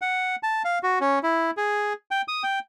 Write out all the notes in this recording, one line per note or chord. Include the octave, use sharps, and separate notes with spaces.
F#5
A5
F5
F#4
C#4
E4
G#4
G5
D#6
G5